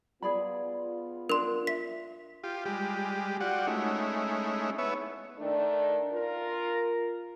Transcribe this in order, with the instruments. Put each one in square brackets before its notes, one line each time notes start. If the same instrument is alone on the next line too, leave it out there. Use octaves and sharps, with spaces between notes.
[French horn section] B3 F4 [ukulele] G#4 D5 B5
[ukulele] D4 [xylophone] A#4 C6
[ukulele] E5 [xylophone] B6
[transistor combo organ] F4 G4
G3 G#3 G4
F4 F#4 D5 F#5 G5
G#3 A3 C#4 D#4 E4
B3 C#5 E5
[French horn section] D#3 A3 D4
F4 A#4